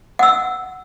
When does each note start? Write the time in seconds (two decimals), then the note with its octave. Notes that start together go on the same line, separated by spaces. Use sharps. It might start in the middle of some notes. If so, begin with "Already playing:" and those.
0.19 F#5 E6